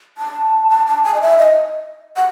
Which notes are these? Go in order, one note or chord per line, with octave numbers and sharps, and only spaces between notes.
A5
A5
A5
G#5
D#5
E5
D#5
F#5